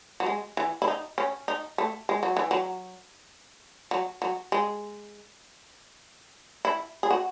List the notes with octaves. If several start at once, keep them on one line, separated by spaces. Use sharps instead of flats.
F#3
G#3
E3
E4
D#4
C#4
D#4
A3
G#3
F#3
E3
F#3
F#3
F#3
G#3
E4
G#4
F#4